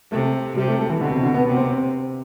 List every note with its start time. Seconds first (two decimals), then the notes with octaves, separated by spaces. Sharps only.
0.12 C3 A3
0.56 C3 G3
0.68 A3
0.79 A3
0.90 E3
1.01 B2 D3
1.12 C3
1.23 D3
1.34 B3
1.45 C3 B3
1.57 C4
1.68 C4